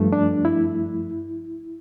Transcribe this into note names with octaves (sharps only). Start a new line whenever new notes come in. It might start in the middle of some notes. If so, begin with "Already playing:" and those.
Already playing: G2 F3 A3
D4
E4